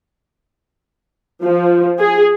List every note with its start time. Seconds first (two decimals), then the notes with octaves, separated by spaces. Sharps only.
1.44 F3
1.99 G#4